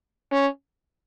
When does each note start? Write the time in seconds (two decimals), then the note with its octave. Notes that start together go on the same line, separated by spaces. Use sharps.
0.32 C#4